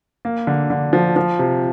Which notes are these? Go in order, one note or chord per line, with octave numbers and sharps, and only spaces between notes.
A#3
D3
D3
F3
F3
C3